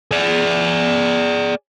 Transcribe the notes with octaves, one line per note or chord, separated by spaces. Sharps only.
G#4 D5